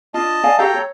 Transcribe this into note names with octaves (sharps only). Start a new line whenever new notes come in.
D4 F4 D#5 A5
D5 F5 G#5
F#4 G4 A4 F5 G5 A#5
C#5